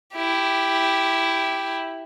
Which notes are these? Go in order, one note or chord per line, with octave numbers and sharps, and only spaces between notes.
E4 G4